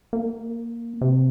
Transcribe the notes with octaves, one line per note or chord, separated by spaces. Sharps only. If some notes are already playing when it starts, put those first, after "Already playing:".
A#3
C3